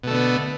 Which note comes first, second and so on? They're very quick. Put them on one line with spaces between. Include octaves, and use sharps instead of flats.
B2 A3 D3 B3